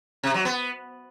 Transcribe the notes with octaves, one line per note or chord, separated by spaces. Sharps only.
C3
F#3
B3